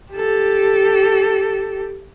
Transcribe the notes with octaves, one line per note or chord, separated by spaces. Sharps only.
G4 A4